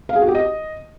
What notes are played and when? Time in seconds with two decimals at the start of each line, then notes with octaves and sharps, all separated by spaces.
0.09 F5
0.16 G#4
0.22 F#4
0.28 G4
0.35 D#5